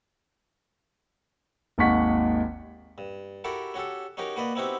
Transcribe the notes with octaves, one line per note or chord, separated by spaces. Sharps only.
G#1 D#2 D#4 F#5 C#6 B6
G2
E4 F#4 G4 A4 A#4
C#4 F#4 G4 A4
C#4 D#4 F#4 G4 A#4
A#3 F#4 B4 D5 D#5
B3 C4 D#4 E4 F#4 G4